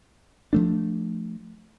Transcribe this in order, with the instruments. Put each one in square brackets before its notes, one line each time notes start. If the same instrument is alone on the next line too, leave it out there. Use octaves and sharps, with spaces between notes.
[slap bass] F3 A3 D4